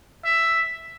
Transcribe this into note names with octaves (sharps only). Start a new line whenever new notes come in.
E5